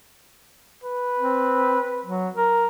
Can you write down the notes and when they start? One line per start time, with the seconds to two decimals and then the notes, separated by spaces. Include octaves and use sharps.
0.84 B4
1.19 C4
2.05 F#3
2.36 A#4